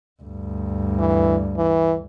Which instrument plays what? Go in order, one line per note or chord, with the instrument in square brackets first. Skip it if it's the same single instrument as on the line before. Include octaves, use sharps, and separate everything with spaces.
[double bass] D2 G2
[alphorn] E3
E3